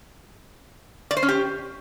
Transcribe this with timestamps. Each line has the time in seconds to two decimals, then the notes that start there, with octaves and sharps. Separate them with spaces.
1.11 D5
1.17 C5
1.23 C#4
1.28 G4